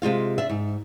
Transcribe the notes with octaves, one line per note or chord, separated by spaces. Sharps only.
C3 G#3 F4 F5
D4 E5
G#2